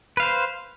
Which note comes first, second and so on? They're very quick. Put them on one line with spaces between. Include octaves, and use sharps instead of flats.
B4 F5 C5